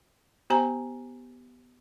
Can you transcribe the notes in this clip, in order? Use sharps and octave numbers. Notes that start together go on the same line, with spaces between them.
B3 G4 C5 G#5 A#5